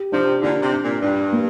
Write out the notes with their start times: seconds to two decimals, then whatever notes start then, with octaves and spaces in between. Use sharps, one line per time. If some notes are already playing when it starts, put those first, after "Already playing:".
Already playing: G4
0.12 C3 F3 D4
0.42 A#2 D3 D4
0.62 C3
0.72 D4
0.83 A#2
1.02 G2 D4
1.32 A#3